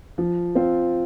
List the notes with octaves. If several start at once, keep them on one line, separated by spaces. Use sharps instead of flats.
F3
C4 F4